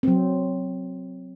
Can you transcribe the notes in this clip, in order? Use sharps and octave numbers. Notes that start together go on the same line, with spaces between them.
F#3 C4